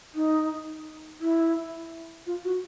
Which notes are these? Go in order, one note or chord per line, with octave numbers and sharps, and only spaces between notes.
D#4
E4
F4
F#4